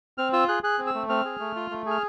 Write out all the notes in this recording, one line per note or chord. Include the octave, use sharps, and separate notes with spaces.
C4 F6
F4 E6
G#4 F#6
G#4 F#6
C4
E6
A3
C4 F6
G#4
A3
F4
A3
G#4 F6